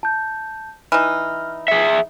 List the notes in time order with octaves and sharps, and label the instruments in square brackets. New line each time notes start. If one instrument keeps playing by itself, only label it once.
[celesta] A5 G6
[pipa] E3 D#4 [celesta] F6
[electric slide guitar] G#4 E5 [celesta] C#7